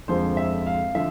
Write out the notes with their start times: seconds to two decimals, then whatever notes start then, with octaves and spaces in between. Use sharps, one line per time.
0.08 F2 D3 F3 G#3 C5
0.37 E5
0.66 F5
0.95 D3 F3 E5